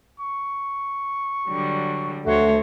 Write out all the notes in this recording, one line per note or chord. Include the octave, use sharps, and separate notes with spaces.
C#6
D3 F#3 G3
D2 A3 F#4 C5 C#5